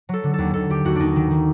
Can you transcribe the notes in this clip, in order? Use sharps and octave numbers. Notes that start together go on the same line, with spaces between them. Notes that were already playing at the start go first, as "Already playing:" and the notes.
F#3 A4
D3
D#2 A4
D#2 A4
D#2 G4
D#2 F#4
D#2 D4 D#4
D#3
D#3